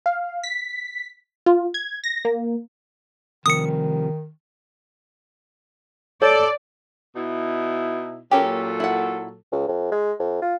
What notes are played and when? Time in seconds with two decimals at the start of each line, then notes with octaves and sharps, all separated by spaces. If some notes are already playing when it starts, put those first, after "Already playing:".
0.06 F5
0.43 B6
1.46 F4
1.74 G#6
2.04 A#6
2.25 A#3
3.46 C3 D#3 F3 G3 D#6 C#7
6.22 A4 C#5 D5
7.16 B2 D#4 E4
8.31 A#2 F#3 A#3 C#4 G4 A4
8.80 E4 F#5
9.52 C#2
9.68 F2
9.92 G#3
10.19 F2
10.42 F4